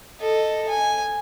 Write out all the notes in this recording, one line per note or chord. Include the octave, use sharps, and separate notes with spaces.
A4 D#5
G#5